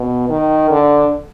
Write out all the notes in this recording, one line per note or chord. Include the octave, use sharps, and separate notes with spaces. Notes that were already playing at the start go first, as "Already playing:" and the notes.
Already playing: B2
D#3
D3